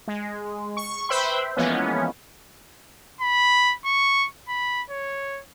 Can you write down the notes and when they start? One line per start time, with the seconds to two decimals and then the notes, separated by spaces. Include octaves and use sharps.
0.07 G#3
0.77 C#6
1.09 B4 C5 E5 G5 B5 C6
1.57 E3 F3 G#3 A#3 B3 C#4
3.21 B5
3.85 C#6
4.48 B5
4.90 C#5